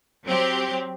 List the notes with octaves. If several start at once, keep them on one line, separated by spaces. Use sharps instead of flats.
F#3 C4 G4